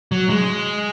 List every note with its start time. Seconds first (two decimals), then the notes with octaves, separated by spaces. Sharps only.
0.12 F#3
0.30 G#3